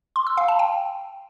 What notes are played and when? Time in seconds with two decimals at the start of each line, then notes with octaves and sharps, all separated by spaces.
0.16 C6
0.27 E6
0.38 F5
0.48 A5
0.59 G5